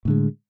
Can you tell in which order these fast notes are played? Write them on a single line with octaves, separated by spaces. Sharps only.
A2 D3 G#3